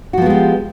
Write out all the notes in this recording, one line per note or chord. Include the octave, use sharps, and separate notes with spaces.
F3 G#3 B3 F#4 G4